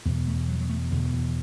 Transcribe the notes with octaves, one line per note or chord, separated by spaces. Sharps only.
E2 B2 B3
A3
F#3
F#3
A3
E2 B2 D3
E3